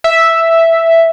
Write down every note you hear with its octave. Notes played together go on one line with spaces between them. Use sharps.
E5